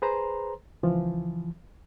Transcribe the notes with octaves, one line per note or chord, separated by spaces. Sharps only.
G#4 B4 C5 A#5 C6
C#2 E3 F3